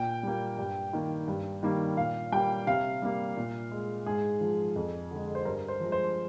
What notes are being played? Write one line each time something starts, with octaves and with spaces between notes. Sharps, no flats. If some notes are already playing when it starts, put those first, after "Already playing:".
Already playing: A#2 G5
G3 A#3
G2
D#3 A#3
G2
D#3 G3 A#3
A#2 F5
G3 A#3 G5
C3 F5
G3 A#3
A#2
G#3
G#2 G#4
F3 G#3
F2
D3 G#3
C5
G2 A#4
C5
F3 G#3
C5